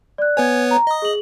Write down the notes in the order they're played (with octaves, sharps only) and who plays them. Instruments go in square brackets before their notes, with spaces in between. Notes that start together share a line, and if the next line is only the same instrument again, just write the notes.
[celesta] D5 F#6
[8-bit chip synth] B3 B4 C#5 [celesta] G#5 G#6
[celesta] A#5
[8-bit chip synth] D#5 D#6
[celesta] G#4 F#7